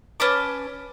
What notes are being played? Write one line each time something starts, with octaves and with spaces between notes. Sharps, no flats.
C#4 B4 A5 D6